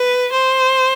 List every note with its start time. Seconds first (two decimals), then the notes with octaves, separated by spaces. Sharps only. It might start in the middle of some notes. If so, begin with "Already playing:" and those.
Already playing: B4
0.33 C5